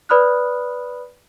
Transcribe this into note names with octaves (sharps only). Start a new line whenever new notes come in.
B4 D5 B5 D#6 F6 F#6